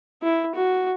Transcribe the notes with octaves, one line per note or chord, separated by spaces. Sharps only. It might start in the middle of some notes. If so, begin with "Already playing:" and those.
E4
F#4